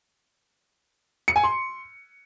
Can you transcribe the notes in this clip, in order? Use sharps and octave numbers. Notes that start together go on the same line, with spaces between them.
C#7
G#5
C6